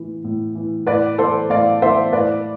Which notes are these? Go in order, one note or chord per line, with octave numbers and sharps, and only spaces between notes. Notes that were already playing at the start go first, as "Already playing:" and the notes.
Already playing: A2 E3
A2
E3
A2 B4 D5
E3 A4 C5
A2 D5 F5
E3 C5 E5
A2 B4 D5